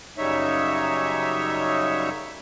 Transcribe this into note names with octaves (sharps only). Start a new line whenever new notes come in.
F#2 C#3 G3 D#4 C#5 E5